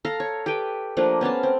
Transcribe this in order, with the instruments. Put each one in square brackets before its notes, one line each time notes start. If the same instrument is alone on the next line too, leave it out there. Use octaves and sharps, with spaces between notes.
[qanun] A4 F5 A#5
C#5
G4 A4 B4 G5
F3 A3 A#3 D4
B3 C#4 F5 A5
C4